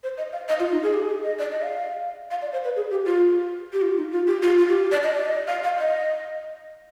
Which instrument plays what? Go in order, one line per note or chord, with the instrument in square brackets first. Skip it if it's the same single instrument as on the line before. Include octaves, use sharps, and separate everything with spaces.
[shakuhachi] C5
D#5
F5
D#5
F4
D#4
G#4
G4
G#4
D#5
D5
D#5
F5
F5
D5
C5
B4
G#4
G4
F4
G4
F4
D#4
F4
G4
F4
F4
G4
D5
D#5
D5
D#5
F5
F5
D#5